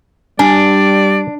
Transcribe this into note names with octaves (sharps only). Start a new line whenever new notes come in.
G3 D4 D5 G#5